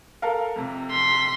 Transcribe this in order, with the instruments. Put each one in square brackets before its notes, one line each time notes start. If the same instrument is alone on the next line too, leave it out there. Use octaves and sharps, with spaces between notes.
[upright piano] A4 A#4 F5
F2 C3
[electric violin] C6 B6